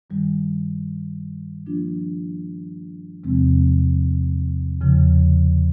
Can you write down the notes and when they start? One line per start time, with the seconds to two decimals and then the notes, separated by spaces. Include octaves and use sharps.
0.10 G2 D#3 G3
1.66 F3 A#3 D4 F4
3.24 E2 C3 F3 G#3 C4
4.81 E2 C#3 F3